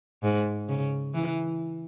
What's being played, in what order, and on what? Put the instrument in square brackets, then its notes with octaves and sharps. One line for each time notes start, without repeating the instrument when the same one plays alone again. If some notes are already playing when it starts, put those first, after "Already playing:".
[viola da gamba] G#2
C#3
E3